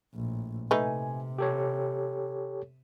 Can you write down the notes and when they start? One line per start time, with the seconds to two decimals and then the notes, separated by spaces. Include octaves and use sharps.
0.14 A#1 A2
0.71 C3 A3 D#4 B4 G#5
1.38 G4 A4 C#5